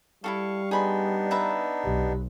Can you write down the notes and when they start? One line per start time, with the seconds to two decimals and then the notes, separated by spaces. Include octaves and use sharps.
0.24 G3 E4 F#4 A4 F5 C#6
0.71 B3 D4 D#4 G#4 B5 C6
1.31 B4 E5 A#5
1.85 B1 G4